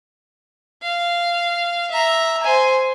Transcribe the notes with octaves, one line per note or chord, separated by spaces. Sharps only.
F5
E5 A#5
C5 G#5